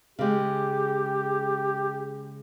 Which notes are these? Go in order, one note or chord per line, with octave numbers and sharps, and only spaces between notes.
C#3 G#3 G4